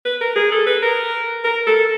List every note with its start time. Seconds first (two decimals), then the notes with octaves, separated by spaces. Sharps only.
0.05 B4
0.21 A#4
0.36 G#4
0.51 A4
0.67 B4
0.82 A#4
1.44 A#4
1.67 A4